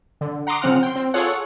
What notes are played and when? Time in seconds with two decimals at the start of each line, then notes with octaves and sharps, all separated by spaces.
0.21 D3
0.47 F#5 A#5 C6 D6 D#6
0.62 C#3 F3 C4 F#5 F6
0.83 G5 C6
0.96 C4
1.14 F4 G#4 A4 C#5 F#5